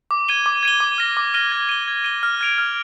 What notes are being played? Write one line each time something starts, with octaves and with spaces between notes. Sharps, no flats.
D6
G#6 D#7 G7
D6
G#6 D#7 G7
D6
F6 A#6 D#7 G7
D6
F6 A#6 D#7 G7
G#6
D#7 G7
G#6
D#7 G7
F6
G#6 D7 F7
F6